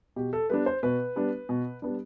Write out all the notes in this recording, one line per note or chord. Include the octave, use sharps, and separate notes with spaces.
B2 G4
A4
G3 B3 D4 B4
C5
B2 B4
G3 B3 D4
B2
G3 B3 D4